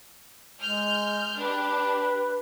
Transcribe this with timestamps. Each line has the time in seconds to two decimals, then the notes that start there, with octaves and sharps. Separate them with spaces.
0.62 G#3 F6 G6
1.38 D4 G4 B4